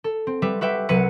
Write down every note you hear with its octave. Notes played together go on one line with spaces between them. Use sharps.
A4
C4
G3 B4 E5
F#4 B4 E5 G5
C2 F#3 B4 C#7 D#7